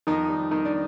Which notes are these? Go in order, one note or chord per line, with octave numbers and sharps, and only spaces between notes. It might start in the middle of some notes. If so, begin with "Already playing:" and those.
F2 D#3 D#4
G3
D#3 D#4
D4